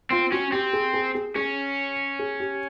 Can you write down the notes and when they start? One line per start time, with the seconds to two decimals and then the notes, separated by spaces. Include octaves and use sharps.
0.10 C4 F4
0.32 C#4 F#4
0.52 C4 G4
0.73 G#4
0.94 G#4
1.15 G#4
1.35 C#4 G#4
2.19 G#4
2.40 G4